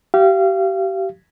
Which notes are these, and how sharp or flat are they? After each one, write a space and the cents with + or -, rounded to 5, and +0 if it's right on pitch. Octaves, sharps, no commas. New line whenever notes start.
G4 -30 F5 -30